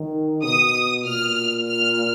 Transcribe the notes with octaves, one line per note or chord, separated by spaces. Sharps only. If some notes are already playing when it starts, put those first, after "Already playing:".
Already playing: D#3
B2 D#6
A#2 F6
F6